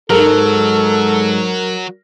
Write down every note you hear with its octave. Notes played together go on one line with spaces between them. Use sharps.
G#2 F#3 A4 A#4